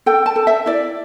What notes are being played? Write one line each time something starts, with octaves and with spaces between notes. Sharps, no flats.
A4 G5
A5
A4
E5
E4 D5